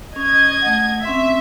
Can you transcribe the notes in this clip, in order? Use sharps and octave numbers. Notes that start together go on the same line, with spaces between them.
C#4 D#5 G#6
A3 F#5
C4 C#4 E5 C6